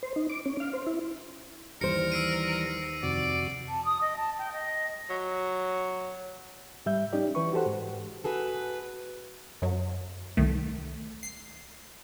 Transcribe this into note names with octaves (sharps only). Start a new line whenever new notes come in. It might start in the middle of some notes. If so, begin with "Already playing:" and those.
C5
D#4
D6
C#4
F5
C5
E4
D#2 E3 G3 A#4 C5 A#6 C#7
E6 C7 D#7
F2 C3 F#4 D5
A5
D#6
D#5
A5
G5
D#5
F#3
G#2 G3 E5 G6
C#4 D#4 G4 D5
E3 B4 C#6
F#4 G4 A4 C5 F#5
G#2
F#4 G#4 A4 B4
F#2 F#3
C2 D#3 A3
C7